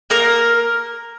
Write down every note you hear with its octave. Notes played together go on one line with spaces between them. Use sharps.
A#3 A#4